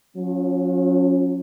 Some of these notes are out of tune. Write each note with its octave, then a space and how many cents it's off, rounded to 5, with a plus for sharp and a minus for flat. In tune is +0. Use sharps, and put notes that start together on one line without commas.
F#3 -45 C#4 -5 F4 +0